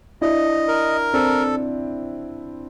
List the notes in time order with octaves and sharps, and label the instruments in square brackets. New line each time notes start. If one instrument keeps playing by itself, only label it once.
[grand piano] D4 E4 [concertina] D#5
[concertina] A#4
[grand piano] C4 D4 [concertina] A4